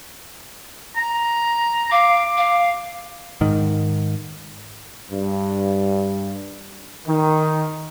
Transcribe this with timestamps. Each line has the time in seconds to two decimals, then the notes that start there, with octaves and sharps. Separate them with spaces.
0.96 A#5
1.91 F5 D6
2.37 F5
3.41 G#2 D#3
5.12 G2
7.08 D#3